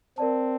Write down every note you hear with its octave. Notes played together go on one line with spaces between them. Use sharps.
C4 A#4 D5 A5